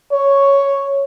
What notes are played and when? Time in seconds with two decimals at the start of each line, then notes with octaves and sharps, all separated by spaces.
0.12 C#5